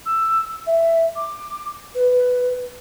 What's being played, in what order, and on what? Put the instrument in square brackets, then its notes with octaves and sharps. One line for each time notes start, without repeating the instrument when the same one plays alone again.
[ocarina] E6
E5
D6
B4